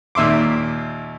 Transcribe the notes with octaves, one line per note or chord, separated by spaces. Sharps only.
D#2 A#2 E5 C6 D6